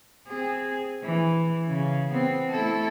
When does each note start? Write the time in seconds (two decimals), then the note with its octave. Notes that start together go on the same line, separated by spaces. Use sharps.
0.28 C4 G#4
1.04 E3
1.67 C#3
2.12 B3 C4
2.51 A3 E4 A4